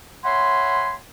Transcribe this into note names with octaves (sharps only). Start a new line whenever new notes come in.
C#5 E5 F#5 G#5 B5 C6